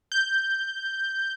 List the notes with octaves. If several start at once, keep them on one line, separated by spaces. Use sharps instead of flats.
G6